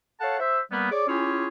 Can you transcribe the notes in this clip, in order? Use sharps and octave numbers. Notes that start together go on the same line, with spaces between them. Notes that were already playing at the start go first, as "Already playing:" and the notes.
A4 C#5 F5 F#5 A5
C5 E5
G3 A#3 B3
G#4 C#5 D5 D6
C#4 E4 F4 G4 G#4 C#5